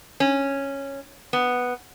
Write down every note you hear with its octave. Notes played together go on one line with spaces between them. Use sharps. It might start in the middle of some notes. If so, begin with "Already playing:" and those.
C#4
B3